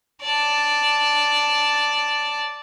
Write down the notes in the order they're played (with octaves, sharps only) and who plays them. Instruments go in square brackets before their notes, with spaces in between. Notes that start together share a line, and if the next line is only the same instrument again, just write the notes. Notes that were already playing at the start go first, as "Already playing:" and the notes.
[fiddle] D5 A5